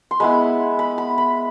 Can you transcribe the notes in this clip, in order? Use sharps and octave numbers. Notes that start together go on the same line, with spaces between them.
C6
G#3 B3 E4 B5
B5
B5
B5